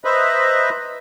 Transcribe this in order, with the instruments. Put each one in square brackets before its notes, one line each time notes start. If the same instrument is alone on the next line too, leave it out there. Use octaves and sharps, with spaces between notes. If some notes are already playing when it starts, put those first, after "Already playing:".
[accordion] B4 C5 D#5 E5 A#5 B5